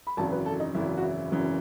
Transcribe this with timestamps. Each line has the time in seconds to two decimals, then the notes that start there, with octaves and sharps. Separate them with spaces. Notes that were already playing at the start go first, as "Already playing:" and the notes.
0.07 B5
0.17 G#1 F#2 C#3 E3 A5
0.32 B4
0.46 A4
0.60 D#4
0.74 G#1 F#2 C#3 E3 E4
0.97 F#4
1.03 E4
1.31 G#1 F#2 C#3 E3